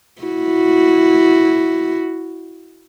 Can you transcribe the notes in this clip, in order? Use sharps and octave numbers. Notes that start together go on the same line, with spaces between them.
E4 F#4